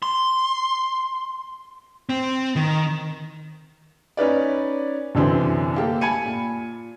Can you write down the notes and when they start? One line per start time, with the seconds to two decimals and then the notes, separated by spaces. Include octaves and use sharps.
0.02 C6
2.09 C4
2.56 D#3
4.17 C#4 D#4 B4 D5
5.15 C2 F#2 D3 E3 C4
5.76 A#3 G4 A4
6.01 G#5 A5 B5 G#6 C#7 D#7
6.25 A#2